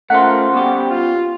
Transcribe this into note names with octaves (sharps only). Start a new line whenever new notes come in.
A3 C#4 F4 A#4 C5 F#5
B2 G3 G4
F4